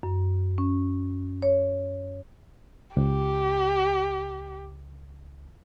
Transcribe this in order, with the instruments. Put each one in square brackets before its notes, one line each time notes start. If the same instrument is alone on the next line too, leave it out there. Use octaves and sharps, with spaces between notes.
[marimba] F#2
C#4
C#5
[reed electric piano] C#2 [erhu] G4